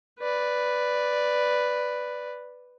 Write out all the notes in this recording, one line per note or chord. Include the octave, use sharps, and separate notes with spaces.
B4 D5